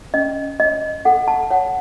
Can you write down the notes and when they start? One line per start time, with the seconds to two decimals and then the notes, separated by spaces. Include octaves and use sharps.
0.14 C#4 D#5
0.60 C#5 D#5
1.05 A4 F#5
1.28 A5
1.51 C#5 F#5